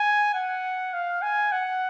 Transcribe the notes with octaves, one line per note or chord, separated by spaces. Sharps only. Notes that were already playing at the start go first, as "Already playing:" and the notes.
Already playing: G#5
F#5
F5
G#5
F#5